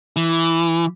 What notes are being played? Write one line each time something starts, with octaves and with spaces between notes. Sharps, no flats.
E3